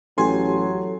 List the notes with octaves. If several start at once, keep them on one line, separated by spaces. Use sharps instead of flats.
A1 F#3 G4 A4 G#5 C6